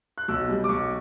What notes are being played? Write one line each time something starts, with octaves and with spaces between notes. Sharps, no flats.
F#6
B1 E6
B2 G3
D6
B1 C#6